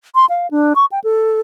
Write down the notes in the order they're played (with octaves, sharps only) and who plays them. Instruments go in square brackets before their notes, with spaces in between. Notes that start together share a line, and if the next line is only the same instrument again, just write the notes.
[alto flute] C6
F5
D4
C#6
G5
A4